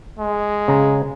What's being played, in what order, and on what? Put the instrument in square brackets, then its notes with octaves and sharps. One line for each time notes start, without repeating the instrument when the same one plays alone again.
[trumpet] G#3
[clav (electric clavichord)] C#3 A#5